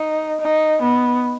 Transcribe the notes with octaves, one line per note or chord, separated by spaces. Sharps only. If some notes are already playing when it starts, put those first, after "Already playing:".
Already playing: D#4
D#4
B3